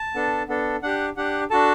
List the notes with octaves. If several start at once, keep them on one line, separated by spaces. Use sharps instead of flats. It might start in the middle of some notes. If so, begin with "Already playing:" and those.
Already playing: A5
B3 D4 A4
B3 D4 A4
D4 G4 F#5
D4 G4 F#5
D4 F#4 A4 A5